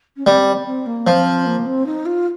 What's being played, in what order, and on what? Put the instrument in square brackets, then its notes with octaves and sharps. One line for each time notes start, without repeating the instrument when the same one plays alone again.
[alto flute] C#4
[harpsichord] G3 [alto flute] C4
[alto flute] C4
A#3
[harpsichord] F3 [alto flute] C4
[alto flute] A#3
C4
D#4
F4